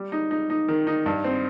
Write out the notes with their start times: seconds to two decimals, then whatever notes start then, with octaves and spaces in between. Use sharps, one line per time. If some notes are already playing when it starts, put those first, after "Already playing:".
Already playing: G3
0.12 D#4
0.31 D#4
0.50 D#4
0.68 D#3
0.87 D#4
1.06 G2
1.24 C4